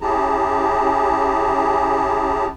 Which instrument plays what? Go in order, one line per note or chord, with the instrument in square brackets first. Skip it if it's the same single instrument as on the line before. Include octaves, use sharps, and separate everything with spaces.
[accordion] C#4 E4 G4 G#4 A5 A#5